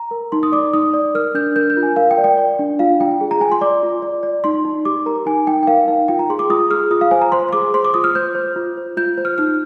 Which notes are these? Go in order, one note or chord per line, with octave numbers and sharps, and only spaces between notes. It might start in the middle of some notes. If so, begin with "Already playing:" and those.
Already playing: A#5
A#4
D#4 C6
D#6
D5 D6
D#4 D#6
D5
A#4 F6
D4 G6
A#4 G6
G6
F4
G#5
A#4 F5
G5
D5
G5
D5
D4
F4 F5
F4 G5
G#4
A#5
F4 G#5
C6
D5 D6
F4
D5
D5
D#4 C6
D#4
G4 D6
A#4 A#5
D#4 G#5
D#4 G5
G5
A#4 F5
D#4 F5
F4 G5
A#5
G#4 C6
D6
F4 D#6
G#4 F6
F4 D#6
F5
C5 G#5
A#5
C5 C6
C6
G#4 D6
C5 C6
D6
F4 D#6
F6
C5 G6
C5
F4
C5
F4 G6
C5
F6
D#4 F6